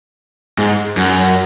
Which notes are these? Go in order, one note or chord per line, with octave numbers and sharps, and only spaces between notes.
G#2
F#2